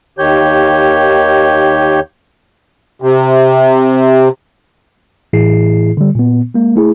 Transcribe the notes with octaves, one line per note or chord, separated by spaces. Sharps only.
D#2 D#3 G4 C#5 G6
C3
A2 E3 E4 G#4 C7
D3 G3
A#2 B3
G#3 A#3
A3 E4 G#4